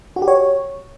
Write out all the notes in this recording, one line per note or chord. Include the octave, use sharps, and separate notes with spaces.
F#4
G4
C#5